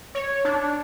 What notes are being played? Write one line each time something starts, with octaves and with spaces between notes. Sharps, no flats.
C#5
D4